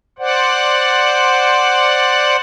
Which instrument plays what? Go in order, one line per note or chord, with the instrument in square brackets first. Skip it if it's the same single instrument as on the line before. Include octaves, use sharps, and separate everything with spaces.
[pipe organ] C5 D5 F#5